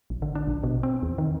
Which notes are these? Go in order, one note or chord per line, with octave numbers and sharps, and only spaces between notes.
A#1
D3
D4
A#1
B2
C4
E2
D#3